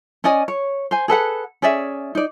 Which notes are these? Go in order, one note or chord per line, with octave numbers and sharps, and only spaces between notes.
C#4 D5 D#5 G#5
C#5
C5 G#5
G#4 A4 B4 F#5
C#4 G#4 D5 E5
D#4 D5